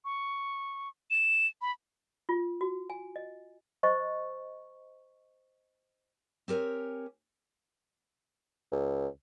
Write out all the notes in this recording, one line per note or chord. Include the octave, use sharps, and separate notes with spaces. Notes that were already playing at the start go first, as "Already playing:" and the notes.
C#6
E7
B5
F4
F#4
G#5
D#5
C5 D#5 C#6
C4 G4 A#4 C#5 G#5
C#2